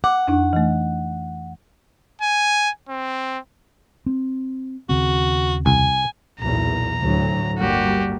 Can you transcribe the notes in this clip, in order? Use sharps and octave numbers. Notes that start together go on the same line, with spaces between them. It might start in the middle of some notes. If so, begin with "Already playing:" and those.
F#5 D6
F2 D4 D#4
E3 A3
G#5
C4
C4
D#2 C#3 C4 F#4
C2 G#5
B1 E2 A#2 A#5
D2 A2 F#3
G1 G3 A#3 F#4 G4